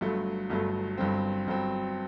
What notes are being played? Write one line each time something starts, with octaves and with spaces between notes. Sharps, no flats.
G1 G2 F#3 A3
G1 G2 F#3 A3
G1 G2 F#3 C4
G1 G2 F#3 C4